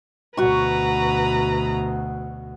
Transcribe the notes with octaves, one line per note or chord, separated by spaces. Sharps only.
D2 B2 F#4 B4 A#5 C#6